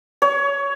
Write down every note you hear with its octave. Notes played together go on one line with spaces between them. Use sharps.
C#5